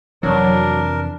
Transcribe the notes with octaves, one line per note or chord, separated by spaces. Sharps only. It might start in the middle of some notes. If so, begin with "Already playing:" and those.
F2 C3 E3 F#3 D4 A#4